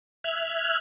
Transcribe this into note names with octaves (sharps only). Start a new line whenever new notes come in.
E5 F6 F#6 G#6